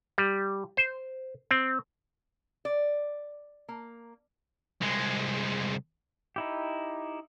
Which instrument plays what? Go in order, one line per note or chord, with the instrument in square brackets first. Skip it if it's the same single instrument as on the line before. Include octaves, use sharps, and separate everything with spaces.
[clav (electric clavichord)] G3
C5
C4
[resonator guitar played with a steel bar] D5
A#3
[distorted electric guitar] C2 G#3
[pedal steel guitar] D#4 E4 G4